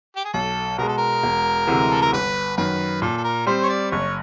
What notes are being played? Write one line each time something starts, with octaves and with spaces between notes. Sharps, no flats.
G4
G#4
B1 A4
B2 G#3 A#4
A4
A#4
E1
D2 C3 E3 G#3
A4
A#4
G1 B4
F#2 D#3 B4
A#2 A4
A4
A#4
G3 C4 C5
C#5
D5
F#1 C#5